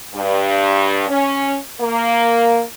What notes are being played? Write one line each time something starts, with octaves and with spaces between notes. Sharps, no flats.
G2
C#4
A#3